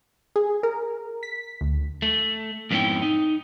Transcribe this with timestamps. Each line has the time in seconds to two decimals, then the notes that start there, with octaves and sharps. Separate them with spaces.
0.36 G#4
0.63 A#4
1.23 B6
1.61 D2
2.02 A3
2.71 F2 G#2 B3 C#4 E4 G5
3.02 D#4